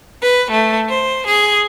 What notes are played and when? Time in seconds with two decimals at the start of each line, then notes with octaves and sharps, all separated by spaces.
0.23 B4
0.52 A3
0.89 C5
1.28 G#4